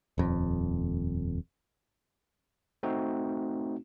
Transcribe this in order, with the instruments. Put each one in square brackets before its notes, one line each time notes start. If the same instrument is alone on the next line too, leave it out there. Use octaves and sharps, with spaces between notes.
[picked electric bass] D#1 F2
[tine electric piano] A3 C4 D#4 F#4